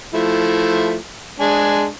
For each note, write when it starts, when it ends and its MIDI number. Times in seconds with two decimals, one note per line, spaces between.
0.14 0.97 53
0.14 0.97 57
0.14 0.97 64
1.40 1.86 56
1.40 1.86 62
1.40 1.86 80